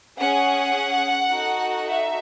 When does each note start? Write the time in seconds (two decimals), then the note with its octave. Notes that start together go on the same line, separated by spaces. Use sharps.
0.18 C#4 G#4 F#5
1.30 D#4 F#4 A4
1.86 E5